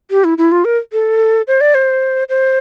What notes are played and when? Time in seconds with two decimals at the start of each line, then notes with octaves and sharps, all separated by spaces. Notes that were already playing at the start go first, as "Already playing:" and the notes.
0.11 G4
0.24 E4
0.38 E4
0.52 F4
0.65 A#4
0.93 A4
1.48 C5
1.61 D5
1.75 C5
2.29 C5